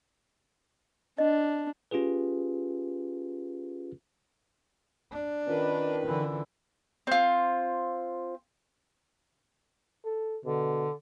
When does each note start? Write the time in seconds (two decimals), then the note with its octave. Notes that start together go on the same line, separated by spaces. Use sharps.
1.18 D4 D#5
1.91 C#4 F4 G4 G#4 B4
5.12 D4
5.47 D#3 C#4 F4 A#4 B4
6.06 D3 E3
7.07 C4 F4
10.05 A4
10.45 B2 D3